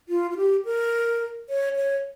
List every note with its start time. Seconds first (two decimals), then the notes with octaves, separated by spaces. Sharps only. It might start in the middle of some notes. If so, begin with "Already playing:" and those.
0.09 F4
0.31 F4
0.37 G4
0.65 A#4
1.49 C#5
1.76 C#5